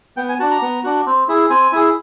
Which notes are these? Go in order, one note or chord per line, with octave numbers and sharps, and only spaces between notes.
B3 G5
G#5
D4 F#4 A5
A#5
B3
D4 F#4
C4
E4 G#4
C4 G#5
E4 G#4